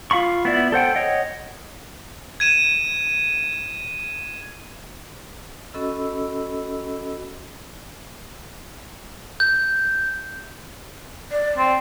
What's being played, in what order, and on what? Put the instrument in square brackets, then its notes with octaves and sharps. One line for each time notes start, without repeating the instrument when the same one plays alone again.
[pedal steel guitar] F4 F5 B5 C#6
B3 E4 D5
A4 C5 F#5 G5
C#5 D#5 F#5
[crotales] G#6 D#7 E7
[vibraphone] C#4 F#4 A4 D#5 B5 E6
[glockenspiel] G6
[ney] D5
[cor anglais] C4